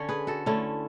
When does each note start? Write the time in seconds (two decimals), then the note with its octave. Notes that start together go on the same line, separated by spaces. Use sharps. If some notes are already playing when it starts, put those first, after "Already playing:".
Already playing: D3 C#4 C#5
0.09 G#4 B4
0.27 F#4 A4
0.46 D3 A3 C#4 E4